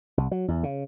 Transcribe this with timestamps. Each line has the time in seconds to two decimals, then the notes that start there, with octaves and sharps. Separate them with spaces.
0.17 C2
0.31 F#3
0.48 E2
0.63 C#3